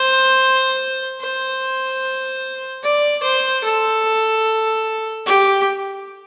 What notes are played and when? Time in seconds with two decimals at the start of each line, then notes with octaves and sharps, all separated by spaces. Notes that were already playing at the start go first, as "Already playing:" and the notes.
Already playing: C5
1.21 C5
2.83 D5
3.23 C5
3.64 A4
5.26 G4